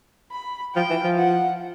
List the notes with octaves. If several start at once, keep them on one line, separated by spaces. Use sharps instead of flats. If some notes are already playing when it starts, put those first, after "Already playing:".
B5
F3 G5
E3
F3
F#5